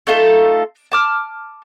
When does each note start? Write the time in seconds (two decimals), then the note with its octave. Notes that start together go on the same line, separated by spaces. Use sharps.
0.07 A3 D#4 F4 A4
0.92 A5 D6 F6